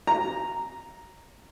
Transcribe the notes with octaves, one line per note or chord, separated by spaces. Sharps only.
A#5